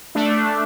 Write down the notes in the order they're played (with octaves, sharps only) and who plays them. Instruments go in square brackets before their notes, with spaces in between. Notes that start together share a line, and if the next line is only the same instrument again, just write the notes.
[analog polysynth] A3 D4